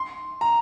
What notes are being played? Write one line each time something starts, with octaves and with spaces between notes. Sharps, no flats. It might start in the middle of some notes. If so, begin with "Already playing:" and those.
Already playing: C6
A#5